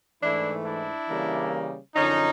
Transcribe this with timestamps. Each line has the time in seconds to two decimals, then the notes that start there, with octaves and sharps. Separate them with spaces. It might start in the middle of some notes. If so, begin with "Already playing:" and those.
0.22 G#2 E3 A3 D4 E4
0.65 D4 E4
1.08 C#3 E3 G3 A#3
1.95 F#2 D3 F3 C#4 D#4